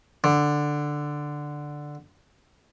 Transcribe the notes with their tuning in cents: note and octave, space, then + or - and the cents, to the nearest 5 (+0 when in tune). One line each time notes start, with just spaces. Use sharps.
D3 +5